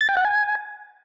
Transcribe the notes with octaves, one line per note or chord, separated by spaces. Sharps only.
A6
G5
F#5
G#5